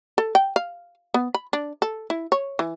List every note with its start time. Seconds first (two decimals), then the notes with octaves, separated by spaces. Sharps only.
0.18 A4
0.35 G5
0.56 F5
1.14 B3
1.34 B5
1.53 D4
1.82 A4
2.10 E4
2.32 C#5
2.59 E3